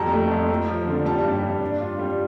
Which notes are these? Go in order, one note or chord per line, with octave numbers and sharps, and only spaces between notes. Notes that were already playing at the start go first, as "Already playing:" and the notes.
Already playing: F2 G3 A5 A#5
A3
F2
F3
F3
D3
G3 A5
G2
G2
D4
F4
G3